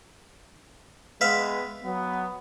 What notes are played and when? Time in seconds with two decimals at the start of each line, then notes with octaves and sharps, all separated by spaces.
1.21 G#3 B3 B4 E5 F5
1.83 F#3 B3